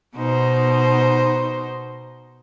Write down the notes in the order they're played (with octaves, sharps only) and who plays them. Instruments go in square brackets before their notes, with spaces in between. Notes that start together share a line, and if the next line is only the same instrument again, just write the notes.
[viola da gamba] B2 D#4 C5